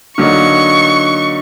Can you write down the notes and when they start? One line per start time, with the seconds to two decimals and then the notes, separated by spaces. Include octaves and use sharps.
0.18 D3 F#3 A#3 D#4 C#6